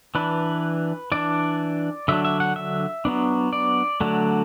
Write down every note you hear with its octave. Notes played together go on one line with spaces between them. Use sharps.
E3 D4 B4
E3 D4 D5
D3 F#3 D4 E5
E5
F#5
E5
F#3 B3 D4
D5
D3 F#3 A3 D4